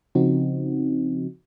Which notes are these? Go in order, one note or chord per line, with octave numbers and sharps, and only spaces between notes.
C#3 F3 C4 D#4 F#4